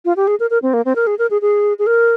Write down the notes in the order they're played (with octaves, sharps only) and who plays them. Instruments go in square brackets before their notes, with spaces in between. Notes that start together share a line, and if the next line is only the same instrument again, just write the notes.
[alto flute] F4
G4
G#4
A#4
A#4
C4
A#3
C4
A#4
G#4
A#4
G#4
G#4
G#4
A#4